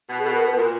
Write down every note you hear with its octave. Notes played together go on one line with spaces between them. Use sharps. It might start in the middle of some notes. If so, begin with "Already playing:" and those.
B2
G#4
B2 A4
A#4
B2
B4
B2
A#2 A#4